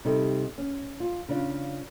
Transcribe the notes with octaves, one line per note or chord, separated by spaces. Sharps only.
C3 G3 C4 D#4 A4
C#4
F4
C#3 D4 F4